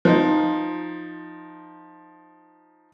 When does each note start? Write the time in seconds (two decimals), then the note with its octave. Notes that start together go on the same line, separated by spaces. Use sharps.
0.05 F3 D#4